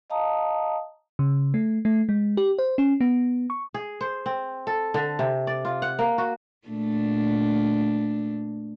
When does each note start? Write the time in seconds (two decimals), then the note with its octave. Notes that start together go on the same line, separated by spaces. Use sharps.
0.10 D#5 F5 A5 A#5 D#6
1.19 C#3
1.54 A3
1.85 A3
2.09 G#3
2.37 G4
2.58 C5
2.78 C#4
3.01 B3
3.50 C#6
3.74 G#4
4.01 C5
4.26 C4
4.67 A4
4.94 D3
5.19 C3
5.47 D5
5.65 F4
5.82 F#5
5.99 A#3
6.18 F#4
6.68 A#2 A3 D4